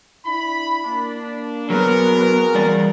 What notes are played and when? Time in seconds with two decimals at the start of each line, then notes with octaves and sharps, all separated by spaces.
0.25 D4 E4 B5
0.84 A#3 D4
1.70 F#3 B3 F#4 G#4 A#4
2.55 E2 G3 D5